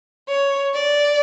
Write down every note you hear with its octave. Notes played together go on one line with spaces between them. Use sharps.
C#5
D5